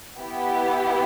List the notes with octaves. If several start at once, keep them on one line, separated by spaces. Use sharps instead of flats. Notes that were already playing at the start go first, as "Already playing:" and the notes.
B3 E4 G4